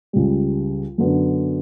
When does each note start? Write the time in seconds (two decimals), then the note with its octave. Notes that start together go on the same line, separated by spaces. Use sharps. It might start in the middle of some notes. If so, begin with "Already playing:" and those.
0.13 C#2 C#3 G3
0.98 F#2 D3 F#3 B3